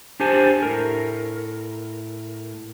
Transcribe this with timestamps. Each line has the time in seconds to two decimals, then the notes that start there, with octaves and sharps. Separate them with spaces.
0.20 D4 G4 C5 G#5 A5
0.63 A2 A#4